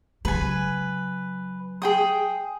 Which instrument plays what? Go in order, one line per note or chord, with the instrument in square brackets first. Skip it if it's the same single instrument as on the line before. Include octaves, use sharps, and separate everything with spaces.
[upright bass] C#3 F#3 [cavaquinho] B4 G#5
[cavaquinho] G#4 G5 D#6